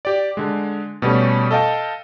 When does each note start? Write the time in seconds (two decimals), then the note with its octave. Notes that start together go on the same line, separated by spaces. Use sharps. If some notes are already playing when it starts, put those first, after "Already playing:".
0.05 G4 D5
0.37 D3 G#3
1.02 B2 G3 A3 C#4
1.51 A4 D#5 F5 G5 A5